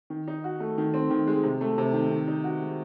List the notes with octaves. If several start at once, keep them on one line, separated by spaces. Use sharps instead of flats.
D#3
D#4
F#4
A3
D#3
C4
D#3
G#3
C3
A3
C3
D#3
D#3
D#4
F#4
G#3